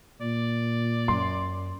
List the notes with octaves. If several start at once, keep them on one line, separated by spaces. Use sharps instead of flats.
A#2 D5
F#2 C6